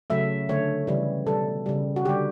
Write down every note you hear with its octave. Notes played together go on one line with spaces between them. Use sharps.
C#3 F#3 A3 E5
D3 A3 C#5
C#3 E3 G3
B2 G3 A4
C#3 G3
F#4
D3 G3 G4